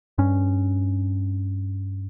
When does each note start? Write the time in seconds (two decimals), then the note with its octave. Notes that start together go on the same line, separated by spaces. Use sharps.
0.18 G2 C#4